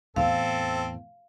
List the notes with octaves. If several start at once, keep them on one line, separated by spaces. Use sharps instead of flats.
E2 A2 C4 A4 F5